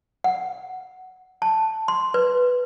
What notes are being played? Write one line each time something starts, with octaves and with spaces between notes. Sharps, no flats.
F#5
A5
C6
B4